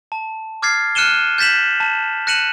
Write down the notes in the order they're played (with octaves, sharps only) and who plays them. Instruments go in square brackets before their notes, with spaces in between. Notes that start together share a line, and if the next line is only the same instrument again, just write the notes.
[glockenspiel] A5
D6 F6 G#6 A6 C7
F6 F#6 C#7 D#7 E7 G7
G6 A6 B6 E7 F#7
A5
F#6 A#6 C#7 D#7 E7 F#7